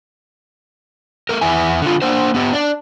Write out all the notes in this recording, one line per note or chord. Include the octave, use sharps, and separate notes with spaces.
A3 A#4
E2 E4 G#5
D3 F4
A#3 D4 C5
B3 G4
D4 D5